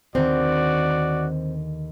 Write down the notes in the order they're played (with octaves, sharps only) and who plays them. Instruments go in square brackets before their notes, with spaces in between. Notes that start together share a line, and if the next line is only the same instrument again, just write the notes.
[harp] D#2 D3 D#3 [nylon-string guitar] C4 [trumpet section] F#4 D5